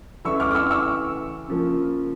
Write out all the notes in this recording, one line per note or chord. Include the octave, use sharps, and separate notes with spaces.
C#3 E3 A3 C#6 E6
D6 F6
D6
C#6 E6
C#6 E6
C#3 F3 A#3